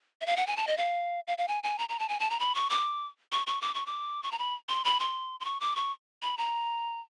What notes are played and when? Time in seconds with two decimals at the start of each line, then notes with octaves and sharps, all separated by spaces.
0.21 E5
0.26 F5
0.37 F#5
0.47 G#5
0.57 A5
0.67 D#5
0.77 F5
1.27 F5
1.38 F5
1.48 G#5
1.63 G#5
1.78 A#5
1.89 A#5
1.99 A5
2.09 G#5
2.20 A5
2.30 A#5
2.39 B5
2.55 C#6
2.70 D6
3.32 C#6
3.47 C#6
3.61 D6
3.75 C#6
3.86 D6
4.23 C#6
4.32 A#5
4.39 B5
4.69 C6
4.85 B5
5.00 C6
5.40 C6
5.45 C#6
5.60 D6
5.76 C#6
6.22 B5
6.38 A#5